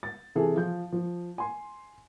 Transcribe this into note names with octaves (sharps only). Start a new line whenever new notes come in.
A6
C3 E3 G#4 A4
F3 F4 G6
F3
G#5 C6